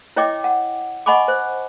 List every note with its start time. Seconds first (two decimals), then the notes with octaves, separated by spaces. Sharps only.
0.16 E4 C#5 D#5 G5 D6
0.44 F#5
1.06 D#5 F#5 G#5 B5 C#6 D6
1.28 C5